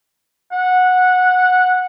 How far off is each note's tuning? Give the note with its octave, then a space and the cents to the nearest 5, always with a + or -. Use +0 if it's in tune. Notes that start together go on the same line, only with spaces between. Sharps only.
F#5 -15